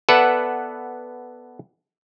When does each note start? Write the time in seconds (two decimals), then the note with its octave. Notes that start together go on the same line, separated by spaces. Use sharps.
0.09 B3 A4 B4 D5 E5 F#5